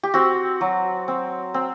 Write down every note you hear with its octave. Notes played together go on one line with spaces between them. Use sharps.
G4
C4 F#4
F#3
C4
C4